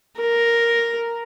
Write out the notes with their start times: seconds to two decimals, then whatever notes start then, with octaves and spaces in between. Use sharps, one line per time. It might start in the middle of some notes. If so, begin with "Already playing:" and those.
0.20 A#4